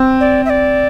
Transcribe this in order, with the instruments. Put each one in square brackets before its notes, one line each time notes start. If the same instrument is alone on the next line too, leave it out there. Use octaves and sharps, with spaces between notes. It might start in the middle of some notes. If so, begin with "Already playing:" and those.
Already playing: [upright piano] C4
[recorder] D5
E5
D5